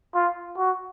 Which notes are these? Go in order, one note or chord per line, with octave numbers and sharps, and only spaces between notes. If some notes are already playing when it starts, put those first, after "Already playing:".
F4
F#4